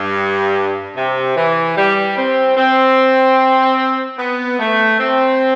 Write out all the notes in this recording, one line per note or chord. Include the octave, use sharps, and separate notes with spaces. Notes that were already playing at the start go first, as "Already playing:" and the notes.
Already playing: G2
C3
E3
G3
C4
C4
B3
A3
C4